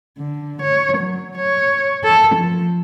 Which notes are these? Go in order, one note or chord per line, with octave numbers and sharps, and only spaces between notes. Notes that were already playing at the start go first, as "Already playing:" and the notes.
D3
C#5
F#3
C#5
A4
F3